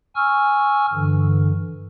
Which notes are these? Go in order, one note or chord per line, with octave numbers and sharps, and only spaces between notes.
G#5 C#6 E6 F6
G2 D3 E3